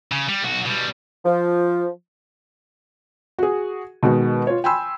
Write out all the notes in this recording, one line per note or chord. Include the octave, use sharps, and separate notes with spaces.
C#3
G3
B1 F#4
B2 G3
F3
F#4 G#4
B2 D#3 G#3 F#4 B4
F4 C#5
G5 G#5 B5 C6 E6